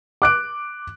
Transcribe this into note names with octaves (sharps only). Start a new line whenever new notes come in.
D6 F#6 D7